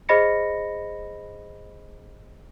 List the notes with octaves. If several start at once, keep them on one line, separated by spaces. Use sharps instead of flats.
G#4 C5 D#5 B5 A#6 C#7